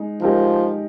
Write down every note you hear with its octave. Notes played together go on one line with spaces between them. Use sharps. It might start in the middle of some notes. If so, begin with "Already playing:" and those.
Already playing: G#3 D#4
F3 G#3 D#4 G4 A#4